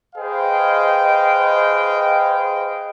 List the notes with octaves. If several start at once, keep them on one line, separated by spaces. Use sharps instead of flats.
G#4 B4 C5 D#5 F5 G5